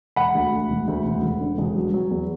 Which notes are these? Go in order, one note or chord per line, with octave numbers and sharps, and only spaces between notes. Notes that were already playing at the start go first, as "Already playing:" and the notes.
E1 F#5 B5
D2
D2
E1
D2
E1
E1
D3
E1
F#3
F#3
E2